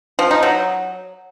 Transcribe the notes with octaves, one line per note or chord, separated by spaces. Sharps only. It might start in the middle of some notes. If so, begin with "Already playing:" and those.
F3
D#4
F#3